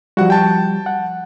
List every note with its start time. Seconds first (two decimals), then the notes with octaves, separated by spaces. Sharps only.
0.17 F3 G3 F#4 F#5
0.30 G5 A5
0.86 F#5